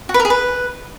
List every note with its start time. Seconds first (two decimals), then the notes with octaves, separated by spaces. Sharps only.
0.09 F#4
0.14 B4
0.20 A#4
0.25 G#4
0.30 B4